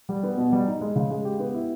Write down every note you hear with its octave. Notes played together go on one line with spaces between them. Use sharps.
G3
B3
B2
G3
D#4
G#3
C#3
G#3
G4
B3
E4